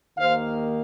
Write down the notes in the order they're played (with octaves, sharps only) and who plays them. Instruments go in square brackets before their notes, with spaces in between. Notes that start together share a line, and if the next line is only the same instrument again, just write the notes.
[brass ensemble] D#2 D#3 A#3 C5 F5